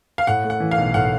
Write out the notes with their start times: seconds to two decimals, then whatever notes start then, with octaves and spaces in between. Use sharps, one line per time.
0.18 F5
0.27 A2 F#5
0.44 A3
0.50 F#5
0.60 E3
0.71 F5
0.78 B1
0.94 A2 F#5